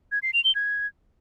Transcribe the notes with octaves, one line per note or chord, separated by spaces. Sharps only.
G#6
C7
F7
G7
G#6